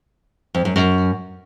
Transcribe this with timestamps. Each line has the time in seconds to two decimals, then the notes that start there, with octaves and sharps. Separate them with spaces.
0.55 F2
0.65 F#2
0.76 F#2